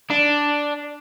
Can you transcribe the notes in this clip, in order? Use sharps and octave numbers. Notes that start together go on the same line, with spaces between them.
D4